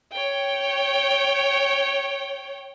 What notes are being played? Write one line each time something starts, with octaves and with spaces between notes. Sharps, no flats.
C#5 G5